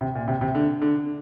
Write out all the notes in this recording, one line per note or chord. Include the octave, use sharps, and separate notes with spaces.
C3
A#2
C3
C3
D3
D3